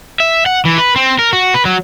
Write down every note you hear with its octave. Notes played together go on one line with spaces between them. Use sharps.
E5
F#5
E3
B4
C4
A#4
F#4
B4
F#3